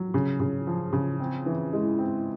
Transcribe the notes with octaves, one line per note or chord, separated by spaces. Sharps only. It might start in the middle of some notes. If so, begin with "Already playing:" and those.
Already playing: F#3
C#3
C#3
F3
C#3
C4
E3
G#3
C4